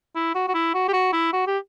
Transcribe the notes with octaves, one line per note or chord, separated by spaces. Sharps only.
E4
F#4
F#4
E4
F#4
G4
F#4
E4
F#4
G4